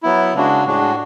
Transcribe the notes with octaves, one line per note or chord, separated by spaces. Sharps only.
F#3 B3 E4
C#3 G#3 D4 F#4
A2 G#3 D4 F#4